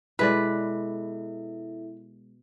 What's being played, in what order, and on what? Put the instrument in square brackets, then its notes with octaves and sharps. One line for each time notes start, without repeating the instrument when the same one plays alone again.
[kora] B2 G#3 D5 [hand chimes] E4 A4 E5 [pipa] B4